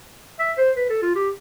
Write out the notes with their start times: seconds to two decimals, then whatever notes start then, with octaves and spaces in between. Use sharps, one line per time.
0.39 E5
0.58 C5
0.76 B4
0.89 A4
1.02 F4
1.15 G4